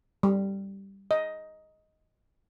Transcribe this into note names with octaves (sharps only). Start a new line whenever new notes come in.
G3
D#5